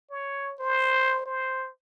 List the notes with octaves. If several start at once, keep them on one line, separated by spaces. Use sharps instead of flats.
C#5
C5
C5